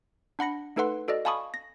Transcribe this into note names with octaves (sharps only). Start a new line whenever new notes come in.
D4 F#5 B5 A#6 C#7
A3 D#4 A4 B4 F#5 C6
F#4 A4 D5 D#5
F5 G#5 A5 B5 C#6 D#6
A#6